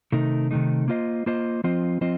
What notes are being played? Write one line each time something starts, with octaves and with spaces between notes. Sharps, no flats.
C3 D#3 A3 D#4
C3 D#3 A3 D#4
A#3 F4 C5 D#5
A#3 F4 C5 D#5
F3 C4 F4 C5 D#5
F3 C4 F4 C5 D#5